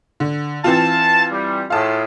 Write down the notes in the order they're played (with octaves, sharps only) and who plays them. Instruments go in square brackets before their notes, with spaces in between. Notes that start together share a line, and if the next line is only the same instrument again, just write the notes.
[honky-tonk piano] D3
[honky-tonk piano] E3 C4 F4 [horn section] A5
[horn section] G3
[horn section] A2 F4 G#4 [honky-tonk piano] F5 A5